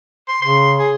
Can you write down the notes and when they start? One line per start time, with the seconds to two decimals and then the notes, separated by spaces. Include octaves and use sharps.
0.28 C6
0.42 C#3 C6
0.79 G#4